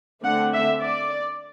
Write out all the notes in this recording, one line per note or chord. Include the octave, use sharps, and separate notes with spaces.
D3 A3 C4 F#5
E5
D5